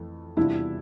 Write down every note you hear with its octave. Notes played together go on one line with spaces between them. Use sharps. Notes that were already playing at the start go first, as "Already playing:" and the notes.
Already playing: F2 E3 A3
E2 C3 G3 D4 E4 F4